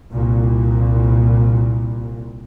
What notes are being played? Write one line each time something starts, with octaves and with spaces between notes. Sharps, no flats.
C2 A#2